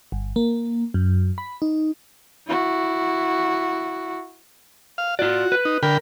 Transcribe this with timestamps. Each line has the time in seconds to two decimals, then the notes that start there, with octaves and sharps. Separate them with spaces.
0.12 G1
0.36 A#3
0.94 F#2
1.38 B5
1.62 D#4
2.47 E4 F#4
4.98 F5
5.19 F4 F#4 D5
5.52 B4
5.65 D#4
5.83 D3 A#4 G5 B5